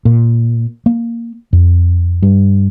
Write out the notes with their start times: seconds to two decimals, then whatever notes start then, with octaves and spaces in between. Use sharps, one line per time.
0.05 A#2
0.86 A#3
1.53 F2
2.22 G2